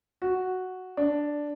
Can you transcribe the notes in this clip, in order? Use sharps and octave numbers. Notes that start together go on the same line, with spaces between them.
F#4
D4